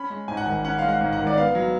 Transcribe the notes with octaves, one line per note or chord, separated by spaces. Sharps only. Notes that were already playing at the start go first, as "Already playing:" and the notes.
Already playing: C#4 B5
G#3
G#2 G#5
F#5
G#1 G#5
C#4 F#5
G#3 F5
F#5
G#2
F#5
G#1
D5
B3 F5
F#3